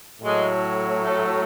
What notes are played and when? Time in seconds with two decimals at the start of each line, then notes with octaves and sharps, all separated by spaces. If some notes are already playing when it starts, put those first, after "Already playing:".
0.21 A2 F#3 G#3
1.02 A3